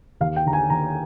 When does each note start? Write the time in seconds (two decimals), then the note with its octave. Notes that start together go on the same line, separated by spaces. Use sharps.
0.21 D#2 F5
0.36 G5
0.46 D3 A#5
0.53 G#5
0.70 D#2 A#5